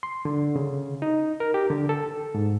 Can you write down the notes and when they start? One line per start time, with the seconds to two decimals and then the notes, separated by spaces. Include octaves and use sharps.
0.03 C6
0.25 D3
0.56 C#3
1.02 D#4
1.40 A#4
1.54 G4
1.70 D3
1.89 A4
2.35 G#2